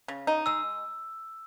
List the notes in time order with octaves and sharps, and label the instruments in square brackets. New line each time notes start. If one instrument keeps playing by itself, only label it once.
[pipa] C#3
D#4
[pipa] G#3 [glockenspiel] E6